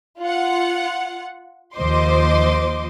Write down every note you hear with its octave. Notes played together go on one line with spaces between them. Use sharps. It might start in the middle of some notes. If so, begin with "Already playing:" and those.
F4 F#5
D#2 F3 C5 D#5 C6 D6